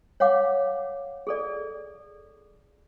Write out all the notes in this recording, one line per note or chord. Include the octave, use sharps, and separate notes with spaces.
C#5 F5 F#5 D6
G#4 A4 D5